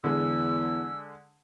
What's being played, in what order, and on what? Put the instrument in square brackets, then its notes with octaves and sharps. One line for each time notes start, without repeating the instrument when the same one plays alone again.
[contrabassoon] E2 [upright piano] D3 G#3 [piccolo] E6